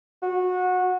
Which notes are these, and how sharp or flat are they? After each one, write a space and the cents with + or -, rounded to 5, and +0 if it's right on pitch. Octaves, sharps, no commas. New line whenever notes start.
F#4 -20